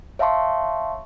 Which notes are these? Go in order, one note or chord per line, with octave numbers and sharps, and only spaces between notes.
C#5 E5 F5 A5 C6 C#6